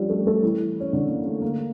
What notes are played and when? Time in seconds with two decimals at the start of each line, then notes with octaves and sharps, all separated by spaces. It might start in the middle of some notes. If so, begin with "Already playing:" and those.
Already playing: F3 G3 C#4 D4 F4 G4
0.09 A3 A4
0.26 A3 A4
0.43 E3 E4
0.80 C#4
0.92 D3 D4
1.08 A#3
1.26 A3
1.41 A#3